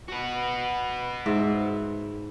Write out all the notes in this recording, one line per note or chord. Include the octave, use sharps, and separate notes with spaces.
F#4 B4
G#2 E5